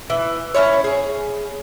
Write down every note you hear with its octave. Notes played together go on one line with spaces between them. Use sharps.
E3
C#4 E4 C#5
G#4